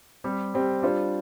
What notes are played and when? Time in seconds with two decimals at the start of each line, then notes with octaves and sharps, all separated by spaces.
0.24 G3 C4 G4
0.54 G3 C4 G4
0.82 G3 D4 F4 C5